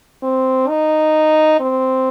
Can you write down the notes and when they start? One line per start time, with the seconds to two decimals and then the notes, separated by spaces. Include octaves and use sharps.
0.23 C4
0.69 D#4
1.60 C4